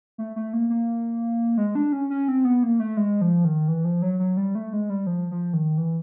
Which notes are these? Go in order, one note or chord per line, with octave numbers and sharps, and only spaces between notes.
A3
A3
A#3
A#3
G#3
D4
C#4
C#4
C4
B3
A#3
A3
G#3
F3
D#3
E3
F3
F#3
F#3
G3
A3
G#3
G3
F3
F3
D#3
E3